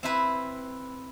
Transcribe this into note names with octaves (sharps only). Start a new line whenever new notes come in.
C4 E4 B4